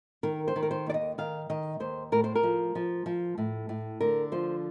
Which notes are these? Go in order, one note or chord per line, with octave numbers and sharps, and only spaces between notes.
D#3 A#4
C5
D#3
A#4
C5
D#2 D5
D#5
D#3 F5
D#3 D#5
D#2 C5
A2 A#4
C5
A#4
F3
F3
F3
A2
A2
D3 A#4
F3 C5